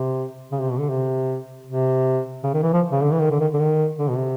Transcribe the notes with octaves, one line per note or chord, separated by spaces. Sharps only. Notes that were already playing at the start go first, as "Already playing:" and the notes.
Already playing: C3
C#3
C3
B2
D3
C3
C3
C#3
D#3
E3
F3
C#3
D3
E3
D#3
D3
D#3
D3
D#3
D3
B2
C3